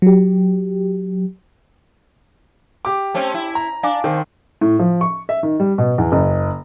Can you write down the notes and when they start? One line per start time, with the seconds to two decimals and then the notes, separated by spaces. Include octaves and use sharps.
0.02 F#3 G4
2.85 G4 D6
3.14 A3 C4 C#4
3.34 E4
3.55 A#5
3.83 D4 F5 G#5 D6
4.04 D#3 C4
4.61 A2
4.79 F3
5.01 C#6
5.29 E5
5.43 D#3
5.60 G3
5.78 B2
5.98 E2
6.12 F#1